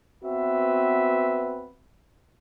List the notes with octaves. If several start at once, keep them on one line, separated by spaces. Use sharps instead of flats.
B3 C4 F#4 B4 E5